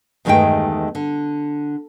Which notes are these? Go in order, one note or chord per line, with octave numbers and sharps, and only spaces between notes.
E2 G2 D#3 G#3 A3 G5
D3